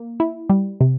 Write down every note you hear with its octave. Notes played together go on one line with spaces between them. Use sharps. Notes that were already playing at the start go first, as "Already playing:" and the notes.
Already playing: A#3
E4
G3
C3